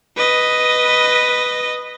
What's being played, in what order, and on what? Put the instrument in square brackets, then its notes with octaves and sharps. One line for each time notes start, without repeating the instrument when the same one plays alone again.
[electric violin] B4 D#5